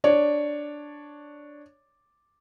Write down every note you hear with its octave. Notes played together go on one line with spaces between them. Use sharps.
D4 C#5 D5